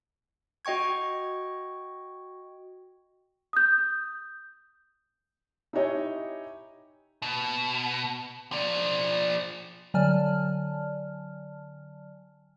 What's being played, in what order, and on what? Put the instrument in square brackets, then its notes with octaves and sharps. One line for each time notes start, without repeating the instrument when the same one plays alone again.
[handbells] F#4 D#5 G5 C#6 G#6
[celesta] D#6 G6
[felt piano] D#4 E4 G4 C#5 D#5 G#5
[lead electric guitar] B2
F3 D5
[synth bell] D3 F#3 D5 G#5 A5 F6